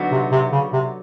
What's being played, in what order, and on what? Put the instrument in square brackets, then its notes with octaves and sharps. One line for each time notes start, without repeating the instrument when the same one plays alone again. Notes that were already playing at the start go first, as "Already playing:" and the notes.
Already playing: [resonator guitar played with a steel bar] D3 F#3 B3 D#4 F#4
[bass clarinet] C3
C3
C#3
C3